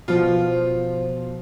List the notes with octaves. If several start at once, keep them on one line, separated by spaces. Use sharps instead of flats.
B2 F3 F4